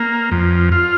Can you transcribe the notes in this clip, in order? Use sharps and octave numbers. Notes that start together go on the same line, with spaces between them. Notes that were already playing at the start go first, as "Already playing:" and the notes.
Already playing: A#3
F2
F4